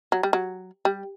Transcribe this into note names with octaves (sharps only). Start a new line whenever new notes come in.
F#3
G3
F#3
G3